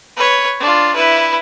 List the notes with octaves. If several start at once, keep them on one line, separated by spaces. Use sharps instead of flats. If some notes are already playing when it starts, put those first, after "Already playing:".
B4 C#5
D4 F4
E4 B4